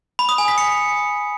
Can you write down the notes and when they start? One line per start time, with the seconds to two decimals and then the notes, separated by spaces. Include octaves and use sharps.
0.19 B5
0.29 D#6
0.38 G#5
0.48 B6
0.58 C#7